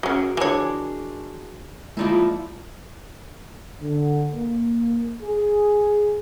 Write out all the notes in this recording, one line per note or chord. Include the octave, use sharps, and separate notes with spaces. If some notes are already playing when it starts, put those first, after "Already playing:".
F#3 C#4 F#4 G#4 A#4
E3 G#3 D4 C#5
F3 G#3 A#3 D#4 E4 D5
D3
A#3
G#4